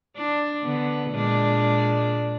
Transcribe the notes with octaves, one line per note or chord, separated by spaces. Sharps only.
D4
D3 B3
A#2 G#3 D4